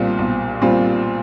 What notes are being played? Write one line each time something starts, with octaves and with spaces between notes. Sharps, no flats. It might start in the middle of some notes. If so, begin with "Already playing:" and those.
Already playing: B1 A#2 G3 C4 F4
B1
A#2 G3 C4 F4